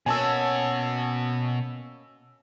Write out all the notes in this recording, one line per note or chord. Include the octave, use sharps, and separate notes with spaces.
B2 A#3 C#4 F#4 G#5 A5 E6